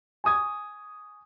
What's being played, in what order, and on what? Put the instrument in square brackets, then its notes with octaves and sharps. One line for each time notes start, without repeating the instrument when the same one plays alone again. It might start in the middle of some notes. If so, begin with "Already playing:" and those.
[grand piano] G#5 C#6 D#6 G#6